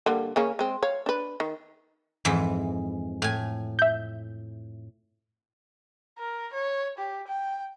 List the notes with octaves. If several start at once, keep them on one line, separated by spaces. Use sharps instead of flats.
D3 G3 A#3
C#3 A#3 C#4
G#3 C4
C#5 F5
D4 B4
D#3
F2 G#2 E3
A2 G#5
E5 G6
A#4
C#5
G4
G5